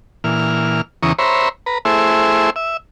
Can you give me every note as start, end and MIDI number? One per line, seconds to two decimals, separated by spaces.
0.24 0.81 46
0.24 0.81 52
0.24 0.81 89
1.03 1.13 40
1.03 1.13 49
1.03 1.13 52
1.03 1.13 82
1.03 1.13 85
1.03 1.13 87
1.19 1.49 72
1.19 1.49 73
1.19 1.49 76
1.19 1.49 82
1.19 1.49 83
1.66 1.78 71
1.66 1.78 82
1.85 2.50 57
1.85 2.50 64
1.85 2.50 68
1.85 2.50 72
1.85 2.50 76
2.56 2.77 76